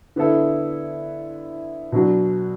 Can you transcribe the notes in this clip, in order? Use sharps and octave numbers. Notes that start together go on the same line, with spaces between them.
D3 B3 E4 A4
B2 F#3 D4 F#4